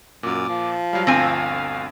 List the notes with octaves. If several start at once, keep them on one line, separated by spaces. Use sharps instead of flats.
F#2 A#2 D6
F3
F#3 G3 F5
G1 D2 C4 F5 G#5